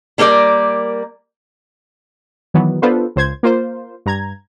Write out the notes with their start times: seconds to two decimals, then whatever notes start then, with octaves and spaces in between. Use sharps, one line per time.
0.18 G3 A#3 A#4 C#5 D5
2.54 D#3 E3 F#3 B3
2.82 B3 D4 F4 A4 B4 C5
3.16 C#2 C5 G#6
3.43 A#3 F4 C5
4.06 G2 A#5 G#6